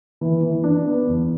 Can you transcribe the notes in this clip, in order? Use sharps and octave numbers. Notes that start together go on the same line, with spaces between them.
E3
E3
D4
B3
E2